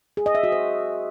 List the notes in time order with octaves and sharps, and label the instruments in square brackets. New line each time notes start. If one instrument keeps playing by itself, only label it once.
[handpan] G#4
D#5
E5
F#4
C5